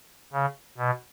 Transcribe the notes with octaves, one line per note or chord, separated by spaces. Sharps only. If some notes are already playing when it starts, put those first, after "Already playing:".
C#3
B2